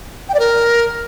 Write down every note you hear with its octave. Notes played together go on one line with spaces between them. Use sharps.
G5
D5
A#4